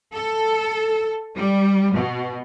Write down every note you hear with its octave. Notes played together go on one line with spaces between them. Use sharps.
A4
G3
B2